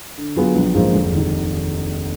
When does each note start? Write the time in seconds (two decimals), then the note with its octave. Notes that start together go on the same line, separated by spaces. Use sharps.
0.18 D3
0.36 F#3 B3 F4 G#4
0.55 A#1
0.75 G#2 F3 A#3
0.93 F1
1.12 D#2 D#3